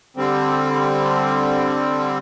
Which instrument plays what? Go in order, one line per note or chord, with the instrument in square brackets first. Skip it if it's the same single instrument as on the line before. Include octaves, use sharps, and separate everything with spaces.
[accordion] D3 G3 C4